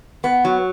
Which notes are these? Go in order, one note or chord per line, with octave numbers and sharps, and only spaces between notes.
B3
F#3